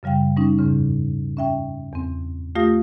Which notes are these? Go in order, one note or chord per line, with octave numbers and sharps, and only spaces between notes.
F#2 C#3 G3 F5 G5
G3 C#4 D#4
E2 G#2 C#3 C#4
C#4 E5 G5
E2 C4
A3 F4 G4 F5 D#6 A#6